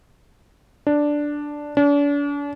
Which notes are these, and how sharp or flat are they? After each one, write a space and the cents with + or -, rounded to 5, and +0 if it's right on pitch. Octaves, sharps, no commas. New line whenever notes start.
D4 +0
D4 -40